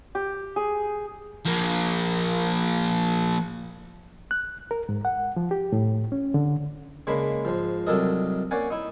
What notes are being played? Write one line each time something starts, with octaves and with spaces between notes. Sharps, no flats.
G4
G#4
F3 A#3
F#6
A#4
G#2
F#5
F3
G4
A2
C#4
D3
C#3 G#3 A#3 D4 B5
G#2 F3
C2 F#3 D4 A4 A#4 D#5
A#3 C#4 D5 F#5 G#5
D#4 E4